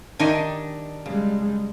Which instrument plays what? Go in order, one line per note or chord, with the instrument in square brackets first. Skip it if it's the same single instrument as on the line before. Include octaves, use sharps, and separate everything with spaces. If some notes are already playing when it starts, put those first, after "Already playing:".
[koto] D#3 G4 G#5 [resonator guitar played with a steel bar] D4 D#4 D#5
[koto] C#3 [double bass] G3 G#3